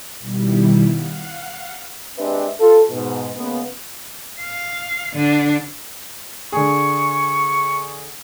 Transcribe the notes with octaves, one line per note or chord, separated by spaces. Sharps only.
B2 D#3 G3 E4
F5 F#5
G#3 C4 D4 G4 B4 E5
F4 A4
G#2 B2
C#3 G#3 A#3 B3
F5
D3 D4
D3 G#4 C#6